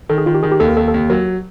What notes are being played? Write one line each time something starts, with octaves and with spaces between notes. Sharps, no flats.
D#3 A4
G#4
D#3 F4
G4
D#3 G#4
G4
D#2 A4
A#4
D#2 A4
A4
D#2
F#3 A#4